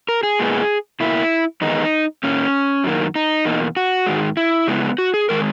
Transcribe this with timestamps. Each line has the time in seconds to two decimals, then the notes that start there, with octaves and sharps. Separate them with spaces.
0.09 A#4
0.23 G#4
0.39 A#2 G#3 B3
1.00 B2 A#3 E4
1.61 E2 D#3 G#3 B3 D#4
2.23 A#2 A#3 C#4
2.84 F#2 D#3 A#3
3.16 D#4
3.45 E2 B2 A#3
3.77 F#4
4.06 G#2 D#3 G#3
4.37 E4
4.68 C#3 G#3 B3
4.98 F#4
5.14 G#4
5.29 D#3 G#3 A#4